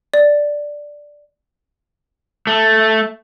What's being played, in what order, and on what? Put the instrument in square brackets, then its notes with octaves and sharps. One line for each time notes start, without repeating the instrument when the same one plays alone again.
[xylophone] D5
[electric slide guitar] A3